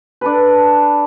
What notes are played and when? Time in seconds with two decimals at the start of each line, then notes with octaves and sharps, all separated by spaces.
0.21 D4 A4 B4